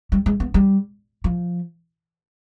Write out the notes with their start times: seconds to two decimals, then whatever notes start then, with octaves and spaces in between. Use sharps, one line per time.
0.12 G3
0.26 G#3
0.40 B3
0.54 G3
1.24 F3